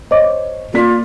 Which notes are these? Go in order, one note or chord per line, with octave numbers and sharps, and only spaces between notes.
C5 C#5 D#5 D6
A#3 F4 D5 B6